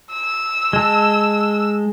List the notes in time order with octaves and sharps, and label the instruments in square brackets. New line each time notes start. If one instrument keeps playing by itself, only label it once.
[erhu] E6
[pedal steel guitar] G#3 A5